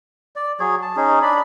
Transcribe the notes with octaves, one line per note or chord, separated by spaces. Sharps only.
D5
F#3 G#4 C#5
A5
C#4 D#4 G#4
D4 D5 B5